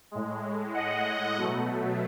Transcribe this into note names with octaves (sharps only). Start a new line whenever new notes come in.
A2 G#3
D#5 F#5
B2 F#3 A3